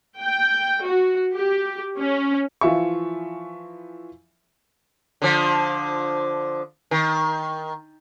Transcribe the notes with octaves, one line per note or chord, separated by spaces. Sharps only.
G5
F#4
G4
C#4
E3 F3 F4 E5 G#5 C#6
D3 F3
D#3